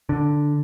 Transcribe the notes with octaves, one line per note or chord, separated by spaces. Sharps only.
D3